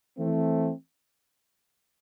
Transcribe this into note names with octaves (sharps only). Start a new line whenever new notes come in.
E3 A3 C4